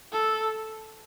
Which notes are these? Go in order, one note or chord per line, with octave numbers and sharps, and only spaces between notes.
A4